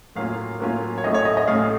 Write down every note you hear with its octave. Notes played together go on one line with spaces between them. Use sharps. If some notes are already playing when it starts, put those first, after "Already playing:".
A2 F#3 A#3 C#4 F4 F5
A2 F#3 A#3 C#4 F4
C#5
A1 A2 A3 C#4 D#5
C#5
D#5
D#5
A1 A2 A3 C#4 F5